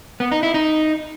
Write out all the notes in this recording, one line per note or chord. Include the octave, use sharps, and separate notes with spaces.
B3
D#4
E4
D#4